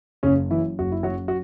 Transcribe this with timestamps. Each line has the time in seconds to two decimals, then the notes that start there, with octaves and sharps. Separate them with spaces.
0.23 F#1 C#3 C#4
0.50 F#2 E3 E4
0.79 F#1 F#4
0.92 E4
1.03 F#2 F#3 F#4
1.28 F#4